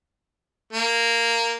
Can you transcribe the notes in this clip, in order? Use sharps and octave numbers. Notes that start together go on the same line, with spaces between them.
A#3